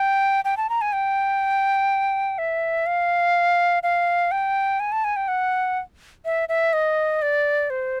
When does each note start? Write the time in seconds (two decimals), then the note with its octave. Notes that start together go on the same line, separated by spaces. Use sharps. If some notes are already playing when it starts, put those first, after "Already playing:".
Already playing: G5
0.45 G5
0.57 A5
0.70 A#5
0.81 G#5
0.93 G5
2.38 E5
2.86 F5
3.83 F5
4.31 G5
4.80 G#5
4.92 A5
5.04 G#5
5.16 G5
5.28 F#5
6.25 E5
6.49 E5
6.73 D#5
7.22 D5
7.70 C5